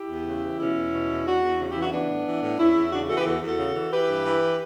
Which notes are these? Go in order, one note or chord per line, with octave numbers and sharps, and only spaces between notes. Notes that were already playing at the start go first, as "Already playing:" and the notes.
Already playing: E4 G4
E2
C#3
E3
B2 C#4 E4
E2
B2
E2
E2 D4 F#4
E2
C#3
E4 G4
E3
D4 F#4
E3 B3 D4
A2
E3
A2
E2 C#4 E4
E2
C#3 D4 F#4
E3 F#4 A4
G4 B4
E2 F#4 A4
E2
F#4 A4
C#3
E3
E3 G4 B4
G2
E3